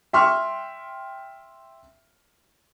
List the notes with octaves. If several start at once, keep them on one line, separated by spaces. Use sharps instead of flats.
E5 G5 C6 C#6 F6